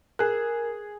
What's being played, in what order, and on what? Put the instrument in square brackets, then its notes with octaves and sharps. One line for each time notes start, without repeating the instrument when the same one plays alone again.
[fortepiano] G#4 F#6 [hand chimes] A#4